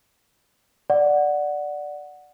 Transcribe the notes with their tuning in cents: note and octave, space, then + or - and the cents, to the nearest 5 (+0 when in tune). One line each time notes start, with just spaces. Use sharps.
D5 +0 F#5 +0